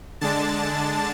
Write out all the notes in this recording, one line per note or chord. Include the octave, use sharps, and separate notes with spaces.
D3 G#3 D4 A5 A6